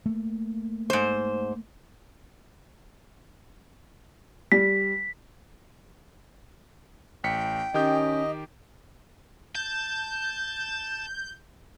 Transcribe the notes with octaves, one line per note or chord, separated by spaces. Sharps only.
A3 A#3
G#2 C5
G3 B6
A1 G5 B6 C#7
D#3 C#4 G4 D#5 G6
A5 G6